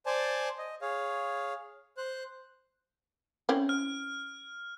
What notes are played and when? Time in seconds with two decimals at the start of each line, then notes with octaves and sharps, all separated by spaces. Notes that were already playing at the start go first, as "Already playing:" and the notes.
0.06 C5 D5 G#5 A5
0.58 D#5
0.82 G#4 C#5 F5
1.97 C5 F#6
3.49 C4 C#4 E4
3.69 F6